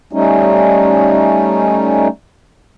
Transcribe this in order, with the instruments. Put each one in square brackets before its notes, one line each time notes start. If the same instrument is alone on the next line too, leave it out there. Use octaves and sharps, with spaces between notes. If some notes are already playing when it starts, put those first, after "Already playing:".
[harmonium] G3 A3 C#4 D#4